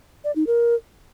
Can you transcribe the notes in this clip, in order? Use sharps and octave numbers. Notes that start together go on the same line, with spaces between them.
D5
D#4
A#4